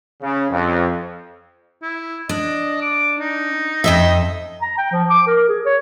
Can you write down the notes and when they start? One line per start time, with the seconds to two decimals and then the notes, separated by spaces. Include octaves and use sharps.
0.22 C#3
0.50 F2
1.83 E4
2.29 D4 D#5
2.82 D6
3.19 D#4
3.84 F2 D#5 E5
4.62 A#5
4.78 G5
4.92 F3
5.10 D6
5.27 A#4
5.49 G#4
5.66 C#5